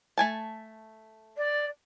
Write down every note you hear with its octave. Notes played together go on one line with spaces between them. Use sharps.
A3 G#5 A5
D5